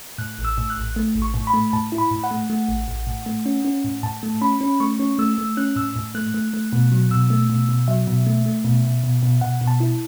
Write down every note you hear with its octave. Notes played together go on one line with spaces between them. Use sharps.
A2 F#6
A1
E6
A2
F#6
A1
A3
A1
C#6
A2
B5
A3
A2 A5
E4
B5
A2
F#5
A3
A3
A1
A1
A2
A3
C#4
C#4
A2
A2 A5
A3
C#4 B5
C#4
A3 C#6
C#4
A3 E6
A3
C#4 F#6
A2 E6
A2
A3 F#6
A3
A3
B2
F#3
B2 E6
A3
B2
B2
F#3 E5
B2
A3
A3
B2
B2
B2
B2
B2 F#5
B2
A5
E4